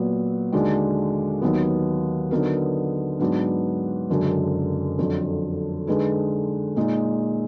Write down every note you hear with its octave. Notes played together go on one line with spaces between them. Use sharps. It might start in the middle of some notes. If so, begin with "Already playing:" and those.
Already playing: A#2 F#3 B3
D#2 D3 G#3 D4 F#4
D#2 D#3 F#3 B3
D3 F#3 B3 D#4 A#4
G#2 F#3 B3 D4
F#1 F#2 D3 G#3
F2 D3 F#3
D3 G#3 D#4 G#4 B4
A#2 G#3 D#4